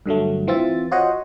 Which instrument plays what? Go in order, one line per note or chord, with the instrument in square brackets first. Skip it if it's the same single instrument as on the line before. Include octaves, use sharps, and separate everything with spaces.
[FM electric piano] G2 D3 F#3 A3
E3 C4 F4 E5 A6
F4 F#4 C5 C#5 D#5 F#5